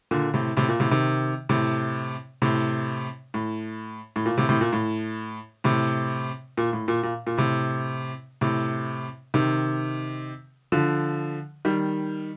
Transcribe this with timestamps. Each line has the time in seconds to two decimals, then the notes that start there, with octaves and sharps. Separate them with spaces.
0.11 A#2 D3
0.34 A2 C3
0.57 A2 C3
0.69 A#2
0.80 A2 C3
0.91 C3 D#3
1.49 A2 C3
2.42 A2 C3
3.34 A2
4.16 A2
4.26 A#2
4.38 A2 C3
4.49 A2 C3
4.61 A#2
4.73 A2
5.64 A2 C3
6.57 A#2
6.73 A2
6.88 A#2
7.03 A#2
7.27 A#2
7.37 A2 C3
8.41 A2 C3
9.34 C3 D#3
10.72 D3 F3
11.65 D#3 G3